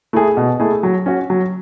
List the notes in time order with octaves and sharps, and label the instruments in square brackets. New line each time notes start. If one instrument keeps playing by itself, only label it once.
[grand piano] A3 E4 G#4
B2
A3 E4 G#4
F#3
C#4 F#4
F#3